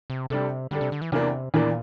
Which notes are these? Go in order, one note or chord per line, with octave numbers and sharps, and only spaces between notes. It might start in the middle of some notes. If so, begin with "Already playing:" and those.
C3
C3 G3 D4 A4
D3 G3 D4 A4
C3
D3
E3
E2 C3 E3 A#3 D4
E2 A#2 E3 A#3 D4